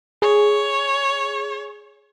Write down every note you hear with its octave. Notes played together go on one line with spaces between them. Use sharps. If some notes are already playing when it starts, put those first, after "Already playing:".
G#4 C#5